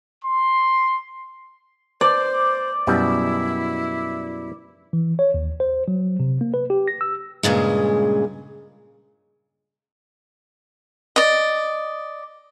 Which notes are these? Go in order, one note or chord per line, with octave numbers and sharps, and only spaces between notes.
C6
C5 D5
F#2 B2 G3 E4
E3
C#5
D#2
C5
F#3
C3
A#3
B4
G4
A#6
E6
G2 A#2 C#3 G#3
D5 D#5